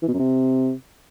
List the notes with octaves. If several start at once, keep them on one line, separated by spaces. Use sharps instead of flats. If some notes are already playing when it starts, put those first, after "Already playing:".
E3
B2
F#2
C3